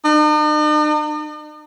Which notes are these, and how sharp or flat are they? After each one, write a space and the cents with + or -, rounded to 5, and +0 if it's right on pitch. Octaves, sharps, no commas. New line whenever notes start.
D#4 -45